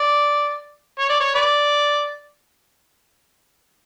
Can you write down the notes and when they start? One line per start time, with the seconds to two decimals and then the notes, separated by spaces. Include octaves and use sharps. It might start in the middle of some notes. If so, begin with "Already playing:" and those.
Already playing: D5
0.99 C#5
1.09 D5
1.20 C#5
1.35 B4 D5